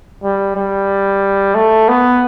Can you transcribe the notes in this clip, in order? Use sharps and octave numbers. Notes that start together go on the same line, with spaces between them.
G3
G3
A3
B3